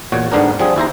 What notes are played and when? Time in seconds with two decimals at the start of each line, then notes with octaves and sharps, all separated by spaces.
0.12 E2 A#2 F#4 C#5
0.32 G1 G#2 D3 B3 D4 A#4
0.59 F3 G3 C4 G#4
0.76 D#2 E4 C5 A#5